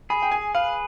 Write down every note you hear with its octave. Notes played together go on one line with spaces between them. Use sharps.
G#4 B5
G5
G#5
B4 F5